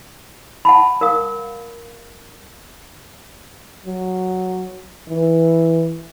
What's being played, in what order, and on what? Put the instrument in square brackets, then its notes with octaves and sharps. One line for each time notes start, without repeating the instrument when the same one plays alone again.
[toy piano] F#5 A5 B5
A#4 F5 D#6
[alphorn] F#3
E3